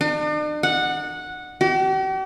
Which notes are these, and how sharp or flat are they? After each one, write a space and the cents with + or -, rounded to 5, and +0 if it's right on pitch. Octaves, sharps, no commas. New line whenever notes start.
D4 +45
F#5 -10
G4 -45